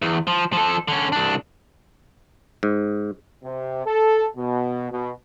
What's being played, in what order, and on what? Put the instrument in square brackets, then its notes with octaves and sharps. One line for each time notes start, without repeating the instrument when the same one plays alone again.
[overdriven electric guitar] E2
F3
F3 A4
D3 C#4
C2 D4
[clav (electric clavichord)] G#2
[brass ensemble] C3
A4
B2
B2